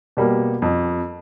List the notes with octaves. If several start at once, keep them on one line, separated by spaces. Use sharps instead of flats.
B2 G3 A#3
F2